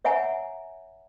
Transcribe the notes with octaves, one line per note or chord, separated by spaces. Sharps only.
C#5 E5 F#5 G#5 A#5